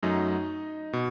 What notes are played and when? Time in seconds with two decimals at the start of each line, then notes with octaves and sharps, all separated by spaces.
0.02 F#2 F#3 A3 D#4 D#5
0.93 B2